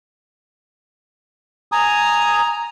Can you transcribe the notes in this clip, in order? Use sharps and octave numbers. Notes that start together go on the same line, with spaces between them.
G#5 A#5 D#6